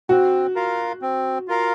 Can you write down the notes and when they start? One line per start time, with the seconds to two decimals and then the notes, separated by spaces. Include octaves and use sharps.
0.09 C4 F#4
0.56 F4 A#4 F5
1.02 C4
1.48 F4 A#4 F5